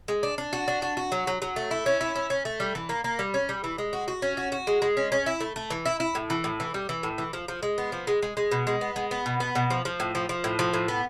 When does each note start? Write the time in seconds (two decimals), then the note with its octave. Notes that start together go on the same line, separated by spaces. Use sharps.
0.08 G#3
0.23 D4
0.38 D4
0.53 F#4
0.68 D4
0.82 F#4
0.97 F#4
1.12 F#3
1.27 F#3
1.42 F#3
1.56 A3
1.71 E4
1.86 C#4
2.01 E4
2.16 C#4
2.30 C#4
2.45 A3
2.60 G3
2.75 E3
2.89 A#3
3.04 A#3
3.19 G3
3.34 C#4
3.49 G3
3.64 E3
3.78 G#3
3.93 F#4
4.08 F#4
4.22 C#4
4.37 F#4
4.52 F#4
4.67 G#3
4.82 G#3
4.97 C#4
5.12 C#4
5.26 E4
5.41 A3
5.56 A3
5.70 E3
5.85 E4
6.00 E4
6.15 A2
6.30 E3
6.44 A2
6.60 E3
6.74 G3
6.89 E3
7.03 A2
7.18 E3
7.33 F3
7.48 F3
7.63 G#3
7.78 B3
7.92 F3
8.07 G#3
8.22 G#3
8.37 G#3
8.51 B2
8.67 G#3
8.81 B3
8.96 G#3
9.11 B3
9.26 B2
9.40 B3
9.55 B2
9.70 F3
9.85 F3
10.00 A2
10.15 F3
10.29 F3
10.44 A2
10.59 F3
10.74 A2
10.88 B3